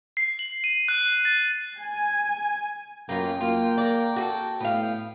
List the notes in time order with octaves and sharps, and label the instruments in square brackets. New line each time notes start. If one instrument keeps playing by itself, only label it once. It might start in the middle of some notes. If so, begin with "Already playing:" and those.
[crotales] C7
F#7
D#7
F#6
A6
[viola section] G#5
[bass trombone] F#2 [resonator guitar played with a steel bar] A#3 B3 F4 [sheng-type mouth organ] G5
[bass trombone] A#3 [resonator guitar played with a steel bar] F4
[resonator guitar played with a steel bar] A#4 D5
F#4 G#4 A4
[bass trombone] A2 [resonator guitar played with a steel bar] B3 F5